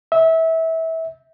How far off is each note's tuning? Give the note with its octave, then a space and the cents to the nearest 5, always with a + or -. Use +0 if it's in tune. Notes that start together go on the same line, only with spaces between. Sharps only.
E5 -25